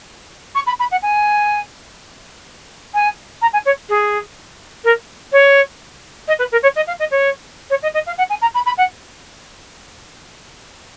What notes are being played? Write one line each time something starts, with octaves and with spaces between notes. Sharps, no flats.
C#6
B5
B5
F#5
G#5
G#5
A#5
G#5
C#5
G#4
A#4
C#5
D#5
B4
A#4
C#5
D#5
F5
D#5
C#5
C#5
D#5
D#5
F5
F#5
G#5
A#5
B5
B5
F#5